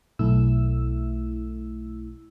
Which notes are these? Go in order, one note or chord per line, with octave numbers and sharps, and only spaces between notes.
B1 A3 E4 E6